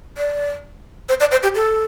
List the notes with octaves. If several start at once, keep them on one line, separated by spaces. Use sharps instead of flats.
D5
C5
D5
C5
G4
A4